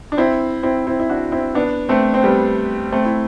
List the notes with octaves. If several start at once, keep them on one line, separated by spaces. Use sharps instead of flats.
D4
C4 E4
C4 E4
C4 E4
E4
D4 F#4
C4 E4
B3 D4
A3 C4
C4
G3 B3
A3 C4
E4